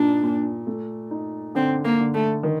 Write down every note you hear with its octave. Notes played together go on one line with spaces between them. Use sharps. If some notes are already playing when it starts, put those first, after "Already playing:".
Already playing: A#2 D4 D#4
A#2
A3
D#4
D3 C4
A#3
D3
A3
D#3